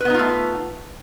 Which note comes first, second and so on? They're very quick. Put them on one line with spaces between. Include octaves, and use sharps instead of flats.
B4 B3 D#4 F4 A3